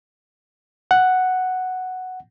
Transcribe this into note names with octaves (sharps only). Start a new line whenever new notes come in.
F#5